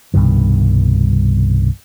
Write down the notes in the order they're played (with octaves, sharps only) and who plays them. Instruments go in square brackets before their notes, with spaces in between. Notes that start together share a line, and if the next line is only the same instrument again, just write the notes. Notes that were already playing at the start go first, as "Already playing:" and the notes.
[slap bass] C2 G2 B2 D#3